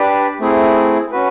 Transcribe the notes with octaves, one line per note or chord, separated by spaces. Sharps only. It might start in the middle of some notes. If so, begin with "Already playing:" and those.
Already playing: D4 G4 B4 D5
A3 C4 E4 G#4
C#4 F#4 B4